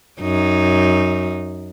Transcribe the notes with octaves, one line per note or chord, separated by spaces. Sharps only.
F#2 D#4